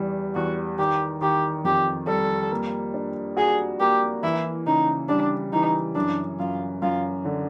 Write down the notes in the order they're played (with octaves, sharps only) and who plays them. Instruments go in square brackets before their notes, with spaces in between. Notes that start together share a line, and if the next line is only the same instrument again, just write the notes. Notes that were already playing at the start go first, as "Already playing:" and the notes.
Already playing: [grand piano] E2 E3 G3
[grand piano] E2 [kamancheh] F#4
[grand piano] D#3 [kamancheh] G4
[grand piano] D#3 [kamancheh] G4
[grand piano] F2 [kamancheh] G4
[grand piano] G3 [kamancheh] A4
[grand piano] A#3
D4
[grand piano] F#4 [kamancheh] G#4
[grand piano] A#3 [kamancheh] G4
[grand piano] E3 [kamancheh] E4
[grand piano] C#3 [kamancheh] D#4
[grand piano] G3 [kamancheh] D4
[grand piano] E3 [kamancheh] D#4
[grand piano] F#2 [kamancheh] D4
[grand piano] F#2 [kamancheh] F4
[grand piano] F#2 [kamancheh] F4
[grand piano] D3